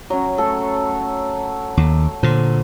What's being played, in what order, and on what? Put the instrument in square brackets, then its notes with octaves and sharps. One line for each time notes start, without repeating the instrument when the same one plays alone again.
[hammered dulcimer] F#3 C#4
A3 F#4 A4
[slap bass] D#2
[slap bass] A#2 D3 [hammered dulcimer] C5